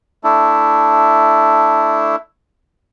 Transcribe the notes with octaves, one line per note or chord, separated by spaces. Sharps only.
A3 D4 E4